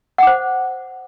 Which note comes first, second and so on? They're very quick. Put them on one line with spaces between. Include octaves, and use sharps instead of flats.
F#5 D6 C5